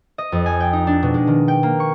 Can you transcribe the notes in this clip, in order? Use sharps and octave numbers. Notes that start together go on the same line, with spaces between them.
D#5
F2
G#5
G5
D#4
D4
B2
G#3
D#3
G5
A#3
C#6